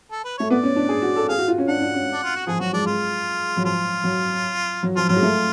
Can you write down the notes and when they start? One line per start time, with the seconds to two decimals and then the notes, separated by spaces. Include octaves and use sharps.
0.11 A4
0.24 B4
0.38 A3 C#5
0.50 B3 D5
0.63 C#4
0.76 D4
0.89 G#4
1.02 F#4
1.16 A4
1.29 G#4 F5
1.38 F#4
1.48 F4
1.58 C#4
1.68 D4 F#5
1.82 D4
1.94 C#4
2.13 D4
2.24 F4
2.36 F#4
2.47 F3 G#4
2.60 F#3 F#4
2.73 G#3 D4
2.86 G#3 F4
3.57 F#3
3.64 F3 F4
4.04 F#3
4.83 F#3
4.96 F3 F4
5.09 F#3 F4
5.16 G#3
5.23 A3